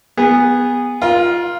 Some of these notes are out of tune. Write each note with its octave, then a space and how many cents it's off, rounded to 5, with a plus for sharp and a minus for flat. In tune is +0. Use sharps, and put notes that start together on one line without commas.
B3 +0 G#4 -20
F4 +0 A#4 +35